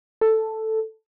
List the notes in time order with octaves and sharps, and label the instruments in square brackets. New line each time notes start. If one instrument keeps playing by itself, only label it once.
[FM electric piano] A4